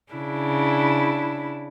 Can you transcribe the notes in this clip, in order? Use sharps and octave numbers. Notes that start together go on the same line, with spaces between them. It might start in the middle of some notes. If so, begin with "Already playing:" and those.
C#3 D4 E4